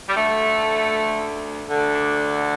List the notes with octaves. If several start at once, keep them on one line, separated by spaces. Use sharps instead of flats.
G3
D2 D3 A3
D2 D3
D4